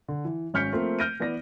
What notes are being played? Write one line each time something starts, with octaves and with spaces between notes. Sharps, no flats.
D3
E3
G#1 C#4 F6 G6 B6 C#7
F3 A3 A#3 C4
F6 G6 A#6 D7 D#7
E3 B3 D5 A#6